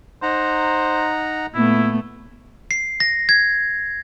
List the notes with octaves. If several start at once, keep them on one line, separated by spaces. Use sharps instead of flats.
D#4 C5 F#5 A#5
A#2 A3 B3 E4
C7
A#6
G#6